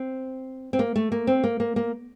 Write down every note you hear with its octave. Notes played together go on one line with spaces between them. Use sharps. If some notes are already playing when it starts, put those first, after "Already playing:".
Already playing: C4
C4
A#3
A3
A#3
C4
A#3
A#3
A#3